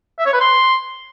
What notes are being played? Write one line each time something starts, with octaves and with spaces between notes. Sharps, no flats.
E5
C#5
B4
C6